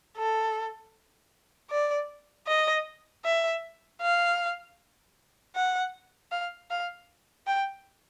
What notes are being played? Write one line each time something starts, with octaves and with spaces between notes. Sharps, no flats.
A4
D5
D#5
E5
F5
F#5
F5
F5
G5